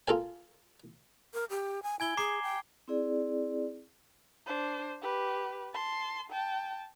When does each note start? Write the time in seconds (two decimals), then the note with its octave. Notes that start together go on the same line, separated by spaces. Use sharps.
0.08 F4 A4 A#4 G#5
1.34 A#4
1.50 G4
1.83 G#5
2.00 E4 G#5 G#6 G7
2.17 G#4 A#5 D6 C7
2.43 G5
2.88 C4 E4 G#4 D5
4.46 D4 C5
5.02 G4 B4
5.74 A5 C6
6.30 G5 A5